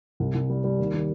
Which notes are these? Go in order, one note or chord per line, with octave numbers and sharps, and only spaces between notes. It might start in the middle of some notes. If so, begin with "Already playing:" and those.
C2
C2
G3
G3
D#2
D#3